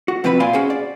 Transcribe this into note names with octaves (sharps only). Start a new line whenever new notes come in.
F#4
C3 F3 C4 B4 A#5 B5
A#2 D5 F5 G#5 C6
C#4 F#4 G#4 C5
D5